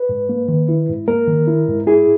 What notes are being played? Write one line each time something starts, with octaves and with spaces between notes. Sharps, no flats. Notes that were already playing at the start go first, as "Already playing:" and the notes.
Already playing: B4
G#2
A#3
D#3
E4
G#2
A#3 A#4
D#3
E4
G#2
E4 G#4